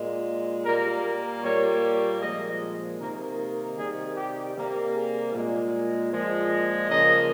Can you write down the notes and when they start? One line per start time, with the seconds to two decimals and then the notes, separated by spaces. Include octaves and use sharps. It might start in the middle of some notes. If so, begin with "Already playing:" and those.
Already playing: A#2 G#3
0.65 A#2 G3 A#3 A#4
1.43 A#2 G3 A#3 C#5
2.21 A#2 F3 G#3 D#5
3.00 C3 D#3 A#3 A#4
3.78 C3 D#3 G3 G#4
4.16 G4
4.56 C3 G3 A#3
4.94 G#4
5.33 A#2 G#3
6.12 A#2 F3 G#3
6.89 C#3 F3 A#3 D#5